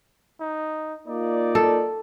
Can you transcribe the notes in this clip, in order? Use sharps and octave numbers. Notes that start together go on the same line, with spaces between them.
D#4
A#3 D#4 F4 D5
A4